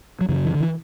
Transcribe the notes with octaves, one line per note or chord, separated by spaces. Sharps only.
F#3
F#2 C#3 E3
E3
D3
E3